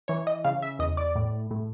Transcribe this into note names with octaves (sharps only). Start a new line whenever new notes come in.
E3 C#5
D#5
C#3 F5
E5
E2 D#5
D5
A2
A2